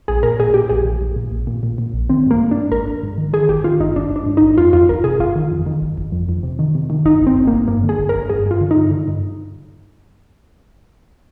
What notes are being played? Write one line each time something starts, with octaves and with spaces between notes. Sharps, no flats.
A#1 G#4
A#2 A#4
A#2 G#4
A#2 G4
A#1 G#4
A#1
A#1
A#2
A#1
A#2
A#2
A#2
A#1
D#3 C4
G#2 A#3
G#2
D4
G#2
G#1 A#4
G#1
G#2
D#3
D#3 G#4
G#1 G4
D#3 F4
G#1 D#4
G#1 D4
G#1
D4
G#2
G#1 D#4
F2 F4
F2 F4
G1 A#4
C3 G#4
G1 F4
D#3
F2
D#3
G1
G1
F2
F2
C3
D#3
C3
D#3
G1 D#4
G1
C4
G1
A#3
G1
G2 A#3
D3
G#4
G1
A#4
G1
G2 G#4
G2 F4
D3
D#4
G2
D3
G2